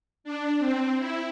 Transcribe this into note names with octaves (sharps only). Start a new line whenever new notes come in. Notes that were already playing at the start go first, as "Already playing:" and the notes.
D4
C4
E4